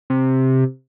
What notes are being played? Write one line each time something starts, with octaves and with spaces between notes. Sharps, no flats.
C3